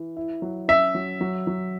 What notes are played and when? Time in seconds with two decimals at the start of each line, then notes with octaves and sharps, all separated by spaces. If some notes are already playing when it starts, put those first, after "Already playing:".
Already playing: E3
0.17 E4
0.42 F#3
0.68 C#4 E5
0.95 F#3
1.21 F#3
1.47 F#3